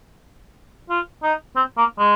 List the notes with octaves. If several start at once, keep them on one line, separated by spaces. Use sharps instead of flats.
F4
D#4
C4
A#3
G#3